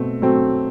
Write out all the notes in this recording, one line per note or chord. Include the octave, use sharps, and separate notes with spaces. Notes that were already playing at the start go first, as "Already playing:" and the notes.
Already playing: B2 A3 C4
F#3 A3 C4